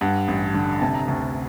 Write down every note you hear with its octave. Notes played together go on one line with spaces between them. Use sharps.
G2 F#5
A1
D3
C3 A5
A#5
D2 A5